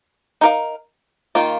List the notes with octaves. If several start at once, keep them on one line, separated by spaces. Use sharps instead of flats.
D#4 A#4 F5
D#3 A#3 F4